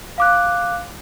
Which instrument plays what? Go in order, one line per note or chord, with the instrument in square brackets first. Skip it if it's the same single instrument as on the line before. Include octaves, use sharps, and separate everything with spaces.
[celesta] F5 D6 F#6